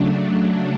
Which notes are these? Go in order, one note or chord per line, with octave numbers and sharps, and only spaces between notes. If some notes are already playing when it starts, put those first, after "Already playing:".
Already playing: C#3 F#3 A3 D4